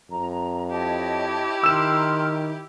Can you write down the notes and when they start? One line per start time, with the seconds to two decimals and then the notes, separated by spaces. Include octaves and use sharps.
0.10 F2 A#5
0.71 E4 G4 C#5 D#5 A5
1.64 D#3 A#5 C6 E6 F6 E7